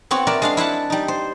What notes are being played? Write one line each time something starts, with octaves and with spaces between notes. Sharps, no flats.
B3 C4 F#4 C#5
F#4 A#4 D5 E5
G#3 D4 F5
E4 E5 F#5 A5
G3 D#4
C5